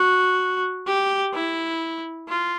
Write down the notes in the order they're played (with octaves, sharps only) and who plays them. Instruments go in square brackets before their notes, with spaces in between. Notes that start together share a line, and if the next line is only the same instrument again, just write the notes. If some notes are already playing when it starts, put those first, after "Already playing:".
Already playing: [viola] F#4
G4
E4
F4